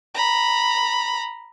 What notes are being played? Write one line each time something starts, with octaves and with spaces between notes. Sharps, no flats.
A#5 B5